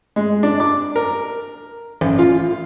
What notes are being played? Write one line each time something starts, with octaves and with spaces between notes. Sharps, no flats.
G#3
D4
D6
A#4
A1
F4